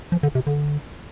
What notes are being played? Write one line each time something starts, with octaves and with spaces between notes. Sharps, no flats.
F3
D3
C3
D3